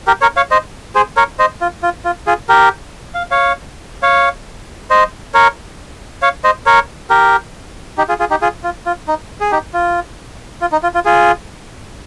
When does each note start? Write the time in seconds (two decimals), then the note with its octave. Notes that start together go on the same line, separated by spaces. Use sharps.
0.07 G4 A#4
0.22 A#4 C#5
0.37 C#5 F5
0.51 C5 D#5
0.95 G#4 C5
1.17 A#4 C#5
1.39 C5 D#5
1.61 F4
1.83 F4
2.05 F4
2.27 F4 G#4
2.49 G4 A#4
3.15 F5
3.31 C#5 F5
4.03 C#5 F5
4.90 C5 D#5
5.34 A#4 C#5
6.22 C#5 F5
6.44 C5 D#5
6.66 A#4 C#5
7.10 G4 A#4
7.98 D#4 G4
8.09 F4 G#4
8.20 F4 G#4
8.31 D#4 G4
8.42 F4 G#4
8.63 F4
8.86 F4
9.08 D#4
9.40 G#4
9.52 D#4 G4
9.74 F4
10.61 F4
10.72 D#4
10.83 F4
10.95 F4
11.05 F4 G#4